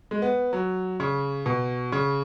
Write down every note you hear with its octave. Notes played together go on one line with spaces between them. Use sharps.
G#3
B3
F#3
C#3
B2
C#3